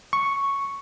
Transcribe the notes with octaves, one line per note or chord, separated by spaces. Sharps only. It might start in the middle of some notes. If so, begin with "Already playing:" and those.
C#6